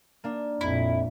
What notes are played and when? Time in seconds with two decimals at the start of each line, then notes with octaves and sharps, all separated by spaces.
0.24 A#3 D4
0.61 A#1 F2 A#2 E4